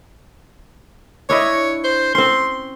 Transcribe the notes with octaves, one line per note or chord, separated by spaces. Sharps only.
D4 E4 C#5 D#5
C5
C4 C#4 C6